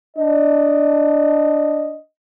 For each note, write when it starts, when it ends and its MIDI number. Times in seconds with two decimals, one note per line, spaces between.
0.17 1.97 62
0.17 1.97 75